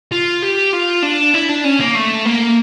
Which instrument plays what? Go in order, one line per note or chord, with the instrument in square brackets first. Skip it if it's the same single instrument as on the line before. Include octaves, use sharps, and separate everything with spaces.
[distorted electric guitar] F4
G4
F4
D4
E4
D4
C#4
A#3
A3
A#3